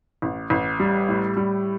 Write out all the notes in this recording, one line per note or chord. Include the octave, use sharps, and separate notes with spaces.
A1
A1
G3
A2
G3